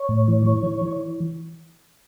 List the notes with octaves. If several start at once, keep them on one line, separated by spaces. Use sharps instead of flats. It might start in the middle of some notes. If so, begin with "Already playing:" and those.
Already playing: C#5
A2
E3
E3
E3
E3